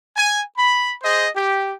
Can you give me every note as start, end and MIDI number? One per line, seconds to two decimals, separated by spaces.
0.17 0.41 80
0.58 0.93 83
1.03 1.28 68
1.03 1.28 72
1.03 1.28 75
1.36 1.74 67